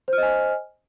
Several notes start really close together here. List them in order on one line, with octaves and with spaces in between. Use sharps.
C5 F6 D#5 G#5